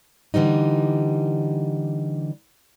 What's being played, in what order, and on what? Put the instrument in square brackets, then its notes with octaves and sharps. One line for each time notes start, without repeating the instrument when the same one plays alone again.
[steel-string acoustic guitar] D3 E3 G3 D#4